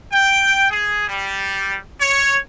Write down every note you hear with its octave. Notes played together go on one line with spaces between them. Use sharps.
G5
G#4
G3
C#5